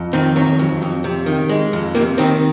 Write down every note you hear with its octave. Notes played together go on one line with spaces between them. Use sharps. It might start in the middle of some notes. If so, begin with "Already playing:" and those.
Already playing: F2
D#3 C4
F#3
F2
F2
C3
D#3
G#3
F2
C3 A#3
D#3 C4